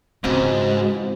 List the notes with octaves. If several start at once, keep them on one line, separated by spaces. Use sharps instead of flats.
G#2 C#3 E3 F3 G#3 C4 F#4